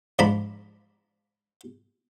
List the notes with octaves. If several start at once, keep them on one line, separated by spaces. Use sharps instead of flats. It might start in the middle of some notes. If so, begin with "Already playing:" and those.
G#2 F3 D4 A#5 B5